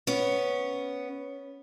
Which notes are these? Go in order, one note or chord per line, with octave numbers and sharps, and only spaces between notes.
B3 C#4